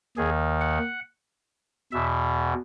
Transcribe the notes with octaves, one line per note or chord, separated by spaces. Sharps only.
D#2 D#3 G#4
F#5
E2 B2 E5